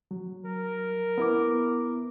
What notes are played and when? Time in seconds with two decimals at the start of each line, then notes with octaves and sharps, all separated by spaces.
0.11 F#3
0.45 A#4
1.18 B3 E4 D6